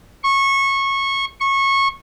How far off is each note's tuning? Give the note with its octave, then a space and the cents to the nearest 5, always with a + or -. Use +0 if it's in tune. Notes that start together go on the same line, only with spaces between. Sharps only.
C#6 -20
C#6 -20